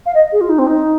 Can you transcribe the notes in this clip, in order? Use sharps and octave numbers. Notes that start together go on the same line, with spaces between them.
F5
D#5
G#4
F4
D#4
C4
D#4